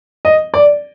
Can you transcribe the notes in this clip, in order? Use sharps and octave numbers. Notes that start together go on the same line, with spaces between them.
D#5
D5